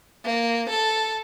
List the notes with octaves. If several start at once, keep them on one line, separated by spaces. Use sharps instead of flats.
A#3
A4